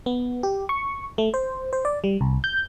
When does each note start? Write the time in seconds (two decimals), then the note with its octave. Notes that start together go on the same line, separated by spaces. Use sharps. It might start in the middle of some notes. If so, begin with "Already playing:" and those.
0.06 B3
0.43 G4
0.69 C#6
1.18 A3
1.34 C5
1.73 C5
1.85 D5
2.04 G3
2.21 C2
2.44 G6